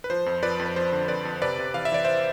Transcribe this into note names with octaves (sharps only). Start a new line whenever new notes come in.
B4
F3 C5
F2
F3 B4 D5
F2
B4
F3 C5
D3
F2 B4 D5
F2
C3 B4 D5
C3
E3 F5
E5
E3 D5
C5 E5